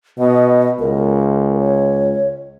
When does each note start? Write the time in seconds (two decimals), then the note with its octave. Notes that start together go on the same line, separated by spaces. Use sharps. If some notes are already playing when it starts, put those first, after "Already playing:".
0.18 B2 D#5
0.80 C#2 A#4
1.61 C#5